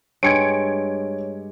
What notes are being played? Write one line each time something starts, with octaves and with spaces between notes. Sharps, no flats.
G2 G#3 C#5 G#6 C#7 D7